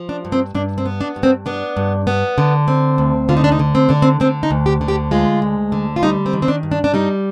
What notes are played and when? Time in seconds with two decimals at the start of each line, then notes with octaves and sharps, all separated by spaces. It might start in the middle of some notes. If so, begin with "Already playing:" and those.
Already playing: F3
0.09 D4
0.25 G2
0.32 C4
0.55 G2 D4
0.78 C4
0.86 B3
1.01 D4
1.16 G2
1.23 C4
1.46 B3 D4
1.77 G2
2.07 B3
2.38 D3
2.68 C4
2.98 D2
3.29 D3 F4
3.37 D#4
3.44 D4
3.52 D#4
3.59 D3
3.75 C4
3.89 D3 D4
4.02 C4
4.20 D3 C4
4.43 D#4
4.51 D2
4.66 G4
4.81 D3
4.88 G4
5.11 G#3 F4
5.42 D2
5.72 D3
5.96 F4
6.03 G3 D#4
6.26 C4
6.33 D#3
6.42 C4
6.48 D4
6.63 G2
6.72 D4
6.84 D4
6.94 G3 D#4